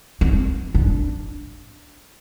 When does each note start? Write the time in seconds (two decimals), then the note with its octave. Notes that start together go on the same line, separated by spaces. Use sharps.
0.21 C4
0.75 D4